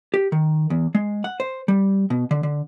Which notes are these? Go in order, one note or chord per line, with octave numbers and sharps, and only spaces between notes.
G4
D#3
E2
G#3
F#5
C5
G3
B2
D3
D3